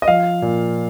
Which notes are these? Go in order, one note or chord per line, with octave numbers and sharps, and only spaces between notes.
D#5
F3 F5
A#2